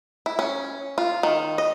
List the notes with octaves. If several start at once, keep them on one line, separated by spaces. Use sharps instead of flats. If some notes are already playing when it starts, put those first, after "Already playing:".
E4
C#4
F4
D#3
D#5